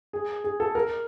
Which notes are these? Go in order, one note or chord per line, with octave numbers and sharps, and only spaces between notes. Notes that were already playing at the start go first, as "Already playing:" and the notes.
G#4
G#4
A4
A#4